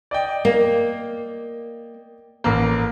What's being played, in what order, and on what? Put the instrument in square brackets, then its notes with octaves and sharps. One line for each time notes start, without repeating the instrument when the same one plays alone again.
[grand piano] D5 D#5 G5
[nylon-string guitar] A#3
[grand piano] A1 A#3